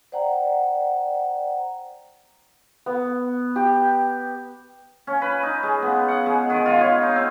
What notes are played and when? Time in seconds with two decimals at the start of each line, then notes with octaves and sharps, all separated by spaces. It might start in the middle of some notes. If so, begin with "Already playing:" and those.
0.12 C5 D5 F#5 G5 A#5
2.86 B3
3.56 G4
5.07 C#4
5.22 B4
5.43 D#4
5.63 G#3
5.82 B3
6.08 F#5
6.26 G#3
6.50 D#3
6.66 F4
6.80 C#5
7.02 D#4
7.16 C4